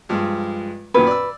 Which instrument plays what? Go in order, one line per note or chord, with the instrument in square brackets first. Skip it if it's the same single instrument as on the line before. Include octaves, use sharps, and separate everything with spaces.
[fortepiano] G2 F3 G#3
[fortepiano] F#2 A#2 D#3 [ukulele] B4
[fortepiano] D5 E6